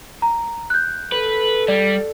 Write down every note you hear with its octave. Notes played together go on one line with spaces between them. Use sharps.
A#5
F#6 G6
A4 B4
G3 D5